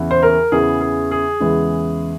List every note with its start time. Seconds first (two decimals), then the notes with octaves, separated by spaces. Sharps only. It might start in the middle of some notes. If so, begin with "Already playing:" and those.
Already playing: E2 C#3 E3
0.11 C5
0.23 A#4
0.52 E2 C#3 E3 G#4
0.81 G#4
1.11 G#4
1.40 E2 C#3 E3 G#3